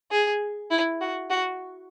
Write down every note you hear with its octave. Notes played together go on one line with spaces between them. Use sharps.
G#4
E4
F#4
F#4